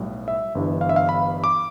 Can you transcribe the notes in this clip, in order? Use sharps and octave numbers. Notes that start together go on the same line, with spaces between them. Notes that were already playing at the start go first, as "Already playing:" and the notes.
Already playing: B1 A2 G3
E5
G1 G2 E3
F5
E5
F5
B5
D6